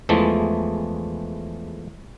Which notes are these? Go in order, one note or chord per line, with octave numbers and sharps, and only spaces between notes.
E2 E3 F3 G#3 A3